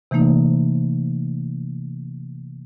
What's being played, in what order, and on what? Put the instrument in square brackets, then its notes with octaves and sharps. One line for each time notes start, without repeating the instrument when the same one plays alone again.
[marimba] C3 E3 A3 A#3 D#4